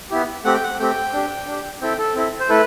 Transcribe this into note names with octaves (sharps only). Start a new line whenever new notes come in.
B3 E4 G4
A3 C4 G4 F#5
G5
F#5
A3 C4 G4 G5
D4 G4
D4 G4
C4 E4 A4 G5
A4
C4 E4 A4
C5
A3 E4 A4 B4